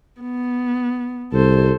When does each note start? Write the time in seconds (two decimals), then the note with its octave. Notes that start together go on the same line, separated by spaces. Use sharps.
0.21 B3
1.32 C2 A4 C5